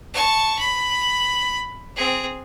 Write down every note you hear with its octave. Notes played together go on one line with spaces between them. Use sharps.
A5 C#6
B5
C4 G#4